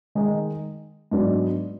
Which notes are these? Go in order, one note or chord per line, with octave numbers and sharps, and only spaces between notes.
D#3 G#3 D#4
G#2 F#3 B3 D4